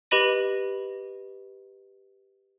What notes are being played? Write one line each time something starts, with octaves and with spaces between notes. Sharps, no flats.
G4 B4 D#5 B5 A#6 D#7